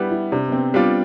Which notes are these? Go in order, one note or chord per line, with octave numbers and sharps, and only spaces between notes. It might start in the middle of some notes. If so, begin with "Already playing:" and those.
Already playing: G3 B3 D4 E4
E4
C3 D4
B3
C4
G3 B3 D4 F4